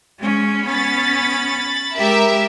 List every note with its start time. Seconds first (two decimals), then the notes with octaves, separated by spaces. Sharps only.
0.19 G#3 C#4
0.66 B3 C#4 B5 A6
1.97 G#3 G4 A#4 E5